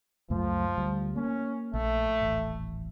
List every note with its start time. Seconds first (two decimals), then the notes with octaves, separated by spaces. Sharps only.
0.30 C#2 F#2 F3 A3
0.78 D2 G3
1.15 A#3 C#4
1.74 A#1 A3
2.21 D#1 A1